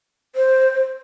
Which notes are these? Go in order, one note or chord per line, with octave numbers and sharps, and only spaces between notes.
C5